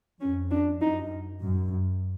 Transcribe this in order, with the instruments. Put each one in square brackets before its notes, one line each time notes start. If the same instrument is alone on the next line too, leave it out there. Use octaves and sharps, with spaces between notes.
[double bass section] F2 [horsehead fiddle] C#4
[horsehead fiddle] D4
[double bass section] F#2 [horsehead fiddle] D#4
[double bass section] F#2